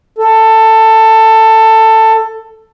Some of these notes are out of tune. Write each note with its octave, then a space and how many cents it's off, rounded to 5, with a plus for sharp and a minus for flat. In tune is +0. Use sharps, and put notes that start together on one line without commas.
A4 +15